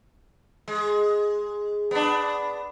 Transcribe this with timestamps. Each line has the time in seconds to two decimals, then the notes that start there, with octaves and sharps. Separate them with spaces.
0.68 G#3
1.91 B3 D4